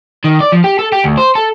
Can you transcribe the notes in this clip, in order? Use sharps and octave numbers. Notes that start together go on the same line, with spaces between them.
D#3
D5
F3
G4
A4
G4
D2
C5
A4